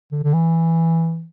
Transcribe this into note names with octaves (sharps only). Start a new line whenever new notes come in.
D3
D3
E3